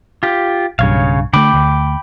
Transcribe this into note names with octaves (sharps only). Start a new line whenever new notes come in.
F4 G4
B1 G2 C#3 C#5 F5
D3 A3 G5 B5 D6
D2